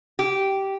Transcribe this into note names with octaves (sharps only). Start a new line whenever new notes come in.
G4